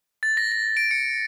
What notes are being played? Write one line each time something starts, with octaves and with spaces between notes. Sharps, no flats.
A6
A#6
A#6
D7
C#7